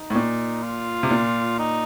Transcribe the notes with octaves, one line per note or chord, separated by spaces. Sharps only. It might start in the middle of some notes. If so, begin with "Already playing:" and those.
Already playing: D#4
A2
A#2
F4
C3
A#2
D#4